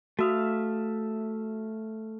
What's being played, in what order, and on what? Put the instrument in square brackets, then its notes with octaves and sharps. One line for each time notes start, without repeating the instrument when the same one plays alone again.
[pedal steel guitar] A3 E5 F5 [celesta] F#4 D#6